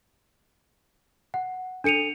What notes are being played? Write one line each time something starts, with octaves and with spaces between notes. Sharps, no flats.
F#5
D4 A4 C#7 D#7 F7